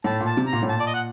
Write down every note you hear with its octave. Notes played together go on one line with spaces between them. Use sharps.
A2 A5
A#2
A5
C3
A#5
A#2
A2
A#2 A5
D5
D#5
F#5